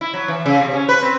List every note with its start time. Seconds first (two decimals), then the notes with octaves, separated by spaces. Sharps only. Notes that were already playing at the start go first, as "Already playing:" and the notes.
0.01 E4
0.14 F#3
0.28 E3
0.46 C#3
0.61 C3
0.73 C#4
0.89 B4
1.02 C4